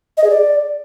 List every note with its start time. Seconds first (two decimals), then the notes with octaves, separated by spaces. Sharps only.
0.17 D#5
0.24 G#4
0.30 D5